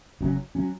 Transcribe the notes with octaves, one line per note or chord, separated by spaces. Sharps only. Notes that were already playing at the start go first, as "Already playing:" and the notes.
F#1 F#2 F#3 C#4
F#3 C#4